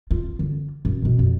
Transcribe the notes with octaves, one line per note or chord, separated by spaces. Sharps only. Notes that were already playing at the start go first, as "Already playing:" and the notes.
F4
D3
F#2
F#2 B2
F2